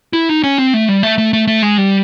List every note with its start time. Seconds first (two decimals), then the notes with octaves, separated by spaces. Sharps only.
0.13 E4
0.29 D#4
0.44 C#4
0.58 C4
0.74 A3
0.88 G3
1.03 A3
1.18 A3
1.33 A3
1.47 A3
1.62 G#3
1.78 G3